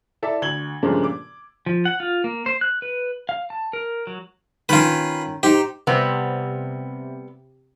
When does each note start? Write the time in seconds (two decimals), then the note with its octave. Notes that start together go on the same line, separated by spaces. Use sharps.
0.23 E4 A4 D5 E5 A5
0.42 D2 G#6 F#7 G7
0.83 G2 A#2 C#3 F3 G#3 A3
1.04 D6
1.66 F3
1.85 F#5
2.00 F4
2.24 A#3
2.46 C5
2.61 F#6
2.82 B4
3.29 F5
3.50 A5
3.73 A#4
4.07 F#3
4.69 D#3 C#4 F4 B4
5.43 D#4 G4 C5
5.87 C3 G3 B3 C4